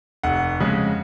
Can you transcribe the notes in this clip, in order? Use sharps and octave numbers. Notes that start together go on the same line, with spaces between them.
F1 F#5
F2 C#3 G#3